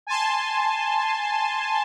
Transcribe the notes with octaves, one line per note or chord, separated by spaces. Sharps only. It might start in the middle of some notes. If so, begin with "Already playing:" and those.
G#5 A5 C6